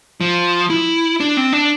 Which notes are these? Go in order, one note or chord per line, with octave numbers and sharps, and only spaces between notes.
F3
E4
D4
C4
D4